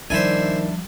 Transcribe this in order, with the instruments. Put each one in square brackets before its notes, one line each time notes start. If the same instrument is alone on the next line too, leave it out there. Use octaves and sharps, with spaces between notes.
[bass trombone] D#3 [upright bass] F3 G3 [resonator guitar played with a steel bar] D4 E4 [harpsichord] C5 E5 G#5